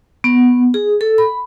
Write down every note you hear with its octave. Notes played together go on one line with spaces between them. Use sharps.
B3
G#4
A4
B5